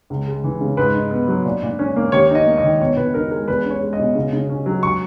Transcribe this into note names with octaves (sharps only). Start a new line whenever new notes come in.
C#2
G#3
E3
C#3
G#2 B4
D#4
B3
F#3
A#2
A#2
C#4
A#3
D#2 C#5
D#4
D#5
A#3
D#5
D#3
B2 C#5
B2 B4
D#4 A#4
G#3 A#4
E2 B4
C#4
C#5
G#3
D#5
B2
C#3
C#3
C#4
F#3
C#6